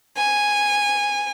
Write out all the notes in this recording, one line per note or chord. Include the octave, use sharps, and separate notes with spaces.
G#5